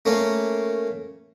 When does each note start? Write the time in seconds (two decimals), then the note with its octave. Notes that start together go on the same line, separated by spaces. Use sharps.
0.05 A3 A#3 C#4